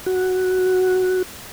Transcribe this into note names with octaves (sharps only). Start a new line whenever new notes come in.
F#4